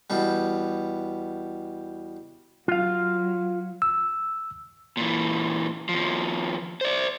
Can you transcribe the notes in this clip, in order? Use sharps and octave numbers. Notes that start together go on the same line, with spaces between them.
E2 B2 G3
F#3 F4 F5
E6
A#2 E3
D#2 F3
C5 D5